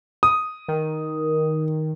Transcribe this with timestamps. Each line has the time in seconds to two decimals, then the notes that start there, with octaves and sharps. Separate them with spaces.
0.23 D#6
0.68 D#3